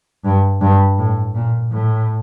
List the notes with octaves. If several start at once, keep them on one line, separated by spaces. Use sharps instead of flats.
G2
G2
A2
A#2
A2